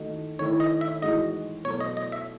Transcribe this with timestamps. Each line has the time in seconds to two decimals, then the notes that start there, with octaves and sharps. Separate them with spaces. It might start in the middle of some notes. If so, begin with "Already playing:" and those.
Already playing: D#3 A3 D#4 F#4
0.39 D#3 A3 E4 C#5
0.60 D#5
0.81 E5
1.02 A2 E3 G#3 D#4 F#4 D#5
1.65 B2 F#3 A3 C#5
1.80 D#5
1.97 D#5
2.12 E5